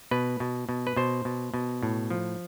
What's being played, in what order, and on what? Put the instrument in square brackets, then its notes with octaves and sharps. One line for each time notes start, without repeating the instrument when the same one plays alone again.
[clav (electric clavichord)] B2 B4
B2
B2
B4
B2 C5
B2
B2
A2
F3